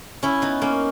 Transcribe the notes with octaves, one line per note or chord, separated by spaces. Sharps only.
C#4 E4
B3 D#4
A#3 C#4